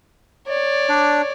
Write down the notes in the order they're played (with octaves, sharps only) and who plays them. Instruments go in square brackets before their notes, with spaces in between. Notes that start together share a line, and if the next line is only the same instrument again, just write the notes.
[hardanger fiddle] C#5 D5
[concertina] D4